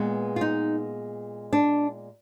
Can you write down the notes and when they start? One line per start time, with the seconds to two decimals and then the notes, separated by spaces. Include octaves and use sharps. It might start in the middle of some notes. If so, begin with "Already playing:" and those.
Already playing: A#2 G#3 B3
0.36 F4
0.41 D#4
1.53 D4